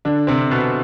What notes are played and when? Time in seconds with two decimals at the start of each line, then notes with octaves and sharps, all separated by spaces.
0.05 D3 D4
0.27 C3 C4
0.51 B2 B3